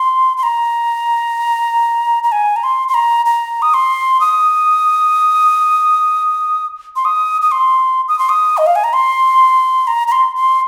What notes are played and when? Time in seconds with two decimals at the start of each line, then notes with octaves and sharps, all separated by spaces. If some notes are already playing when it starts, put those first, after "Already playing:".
Already playing: C6
0.37 C6
0.43 A#5
2.23 A#5
2.32 G#5
2.56 A#5
2.63 C6
2.88 C6
2.94 A#5
3.26 A#5
3.62 D#6
3.74 C6
4.20 D#6
6.96 C6
7.05 D#6
7.42 D#6
7.51 C6
8.08 D#6
8.19 C6
8.29 D#6
8.57 D#5
8.66 F5
8.75 G#5
8.84 A#5
8.93 C6
9.87 A#5
10.07 A#5
10.12 C6
10.35 C6